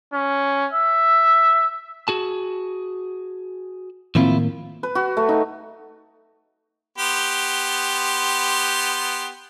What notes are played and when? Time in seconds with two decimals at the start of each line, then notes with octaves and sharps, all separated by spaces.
0.13 C#4
0.73 E5
2.08 F#4 G#4 A5
4.15 A2 D#3 F3 A#3 C4 E4 F4
4.83 B4
4.95 F#4
5.17 A3
5.29 D#4
6.98 B3 G4 C6